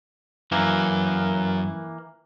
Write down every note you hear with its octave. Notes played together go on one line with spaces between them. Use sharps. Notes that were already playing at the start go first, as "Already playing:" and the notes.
F#2 E3 A#3